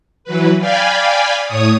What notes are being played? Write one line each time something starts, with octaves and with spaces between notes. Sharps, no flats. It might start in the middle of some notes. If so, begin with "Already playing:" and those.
E3 F#3 B4
D5 F5 G5 G#5 B5
A2 C#5 D#6